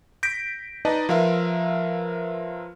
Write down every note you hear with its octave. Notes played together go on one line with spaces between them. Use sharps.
G6 A#6 B6 D7
D#4 B4 D5 D#5 A5
F3 F4 A#4 B4 E5 F5